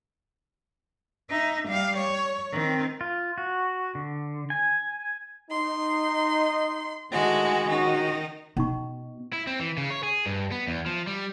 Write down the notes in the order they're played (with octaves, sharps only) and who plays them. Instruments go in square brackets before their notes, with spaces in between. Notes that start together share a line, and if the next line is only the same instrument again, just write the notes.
[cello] D#4 E5
G3 F5
C#5
D#3 C4
[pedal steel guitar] F4
F#4
D3
G#5
[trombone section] D#4 [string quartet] C6
[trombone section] A2 D3 A3 [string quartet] D#3 G#3 F#4
[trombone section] A#1 C#4 F#4 [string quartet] D#3 D#4
[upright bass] B2 [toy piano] C#4 D#4 C#6
[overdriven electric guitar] E4
C4
E3
C#3
C#5
G#4
G2
B3
E2
F3
G3